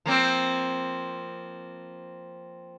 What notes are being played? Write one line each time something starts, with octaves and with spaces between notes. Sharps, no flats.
F3 A#3 C4